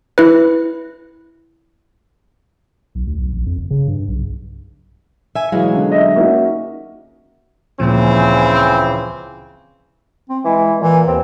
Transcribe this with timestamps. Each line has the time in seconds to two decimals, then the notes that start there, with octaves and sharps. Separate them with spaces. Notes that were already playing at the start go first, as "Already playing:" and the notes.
0.18 E4 B4
2.95 B1
3.07 D2
3.18 B1
3.33 A#1
3.47 F2
3.58 F#1
3.70 C#3
3.88 G2
4.08 B1
5.36 E5 G#5
5.52 B2 E3 F#3 G#3 F5
5.73 C#2 D3
5.92 D#5 E5
6.16 A#3 C#4 D#4 F#4 E5
7.80 D2 A#2 C#3 E3 F3 C4
10.30 C4
10.45 E3 G#3
10.81 A#2 E3
11.07 D#2 C4